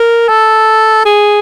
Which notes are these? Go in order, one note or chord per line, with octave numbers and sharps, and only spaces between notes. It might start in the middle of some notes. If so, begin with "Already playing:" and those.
Already playing: A#4
A4
G#4